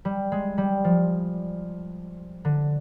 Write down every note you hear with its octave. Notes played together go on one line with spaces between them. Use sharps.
G3
G#3
G3
F3
D3